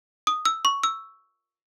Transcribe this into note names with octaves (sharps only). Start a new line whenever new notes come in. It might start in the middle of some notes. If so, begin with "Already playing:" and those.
D#6
E6
C#6
E6